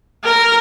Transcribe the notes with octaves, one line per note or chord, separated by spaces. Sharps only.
A#4